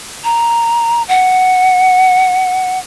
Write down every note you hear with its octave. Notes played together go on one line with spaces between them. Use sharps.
A#5
F#5